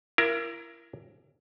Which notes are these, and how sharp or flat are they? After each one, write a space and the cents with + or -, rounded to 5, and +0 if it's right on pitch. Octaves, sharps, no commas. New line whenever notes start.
E4 +35 A#4 +10